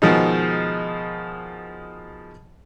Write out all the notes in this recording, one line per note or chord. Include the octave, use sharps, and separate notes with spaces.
B2 D#3 F3 G#3 D#4